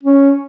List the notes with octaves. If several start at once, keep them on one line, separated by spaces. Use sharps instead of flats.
C#4